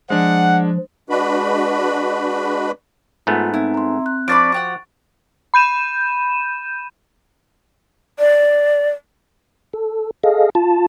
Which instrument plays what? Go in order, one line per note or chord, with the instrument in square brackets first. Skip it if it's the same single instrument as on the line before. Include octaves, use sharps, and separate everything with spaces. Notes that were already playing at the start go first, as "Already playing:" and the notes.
[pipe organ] F3 [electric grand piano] G#3 D4 [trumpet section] F#5
[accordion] G#3 D4 F#4 B4 B5
[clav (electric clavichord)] G#2 A3 B3 [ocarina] F4
[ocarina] C4 [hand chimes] D#4 [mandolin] E4
[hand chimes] A#5 C6
F#6
[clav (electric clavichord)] F3 [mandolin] D4 D5 B5 [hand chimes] C#6 A6 D7
[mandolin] F#4 G4 F#5
[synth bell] B5 G6 D#7 E7
[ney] D5
[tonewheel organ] A4
G#4 A4 D#5 F5
F4 A5